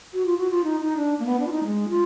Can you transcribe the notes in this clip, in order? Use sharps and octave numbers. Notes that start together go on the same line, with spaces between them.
F#4
F4
F#4
F4
D#4
D#4
D4
A#3
B3
D4
F4
D#4
G#3
F4